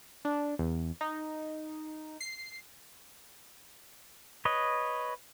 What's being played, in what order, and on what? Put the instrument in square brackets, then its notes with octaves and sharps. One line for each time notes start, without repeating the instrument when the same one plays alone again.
[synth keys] D4
E2
D#4
C7
[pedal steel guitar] B4 C#5 D#5